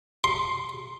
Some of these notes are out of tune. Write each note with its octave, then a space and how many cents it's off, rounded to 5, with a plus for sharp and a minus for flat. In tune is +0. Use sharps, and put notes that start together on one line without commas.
C6 +10